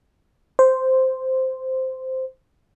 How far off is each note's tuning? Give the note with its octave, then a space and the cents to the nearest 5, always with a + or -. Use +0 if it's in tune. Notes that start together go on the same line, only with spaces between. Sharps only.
C5 -5